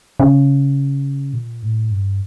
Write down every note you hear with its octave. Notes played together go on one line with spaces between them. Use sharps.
C#3
A#2
A2
G2